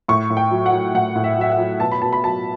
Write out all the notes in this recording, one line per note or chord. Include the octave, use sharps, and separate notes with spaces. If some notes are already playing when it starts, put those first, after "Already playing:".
A2 C#6
A2
G5
F#3
F#5
F#3
A2 F#5
A2
E5
F#3 E5
F#5
F#3
B2 A5
B5
B2 A5
B5
F#3 A5